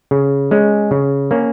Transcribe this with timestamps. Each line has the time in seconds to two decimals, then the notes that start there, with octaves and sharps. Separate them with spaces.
0.11 C#3
0.51 G#3 C#4
0.91 C#3
1.31 A#3 C#4